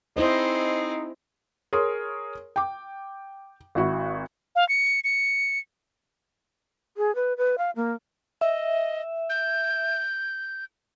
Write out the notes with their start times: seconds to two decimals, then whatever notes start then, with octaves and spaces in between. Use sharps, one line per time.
0.16 C4 D#4 E4 G#4 C5 D#5
1.73 G#4 A#4 C#5 C6
2.56 G5 D6
3.75 G#1 E4 F#4
4.56 F5
4.69 C#7
5.04 C#7
6.97 G#4
7.15 B4
7.37 B4
7.58 F5
7.76 A#3
8.41 D#5 E5
9.30 G6